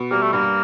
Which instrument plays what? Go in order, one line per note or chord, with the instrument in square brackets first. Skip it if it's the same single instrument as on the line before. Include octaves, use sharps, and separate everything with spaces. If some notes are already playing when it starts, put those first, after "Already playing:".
Already playing: [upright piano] B2
[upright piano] G3 [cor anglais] A#3
[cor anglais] A3
[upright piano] G2 [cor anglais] A#3